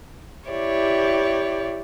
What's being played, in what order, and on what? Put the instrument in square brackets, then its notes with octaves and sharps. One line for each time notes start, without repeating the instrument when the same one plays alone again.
[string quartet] E4 G4 C#5 D5